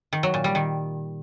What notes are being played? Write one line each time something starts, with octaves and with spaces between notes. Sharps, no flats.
D#3
F#3
A#2
G3
D#3